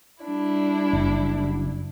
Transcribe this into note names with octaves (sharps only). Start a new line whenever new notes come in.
G3 D4 E4
F#1